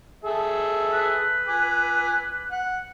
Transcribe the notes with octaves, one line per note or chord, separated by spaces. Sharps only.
G#4 A4 E5
B4
G#5 D6
F#5